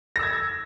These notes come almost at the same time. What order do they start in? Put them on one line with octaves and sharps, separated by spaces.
A#6 E6 G#6